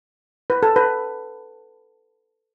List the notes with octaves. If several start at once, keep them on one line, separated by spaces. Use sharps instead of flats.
B4
A4
B4